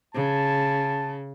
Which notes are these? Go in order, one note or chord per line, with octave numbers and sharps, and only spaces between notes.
C#3 A5